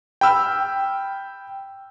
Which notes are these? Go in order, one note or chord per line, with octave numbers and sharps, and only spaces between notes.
G5 B5 E6 F6